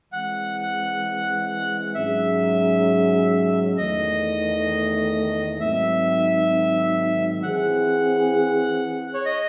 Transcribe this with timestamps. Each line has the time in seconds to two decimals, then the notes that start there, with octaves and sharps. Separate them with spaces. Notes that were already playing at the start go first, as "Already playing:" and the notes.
0.12 E3 G#3 C4 F#5
1.95 G#2 F#3 C#4 G#4 E5
3.77 E2 D#3 A3 D#5
5.60 G#2 D#3 F#3 C4 D#4 E5
7.43 E3 C4 E4 G#4 F#5
9.14 C#5
9.26 D#5